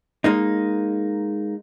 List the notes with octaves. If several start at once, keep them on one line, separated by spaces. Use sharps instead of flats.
G#3 A#3 D#4